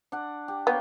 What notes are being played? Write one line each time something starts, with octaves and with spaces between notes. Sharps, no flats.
D4 F#5
G4
A#3 B3 C#5 G5